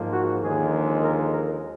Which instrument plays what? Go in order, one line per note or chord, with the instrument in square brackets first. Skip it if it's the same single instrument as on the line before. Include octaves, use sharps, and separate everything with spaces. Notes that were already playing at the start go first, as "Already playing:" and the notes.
Already playing: [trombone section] G#2 F3 A#3
F#4
D#2 D3 F3 G#3 G#4
A#4
A#4